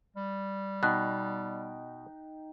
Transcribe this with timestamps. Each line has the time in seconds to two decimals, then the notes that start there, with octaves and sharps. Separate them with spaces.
0.16 G3
0.83 B2 D#4 G5 F#6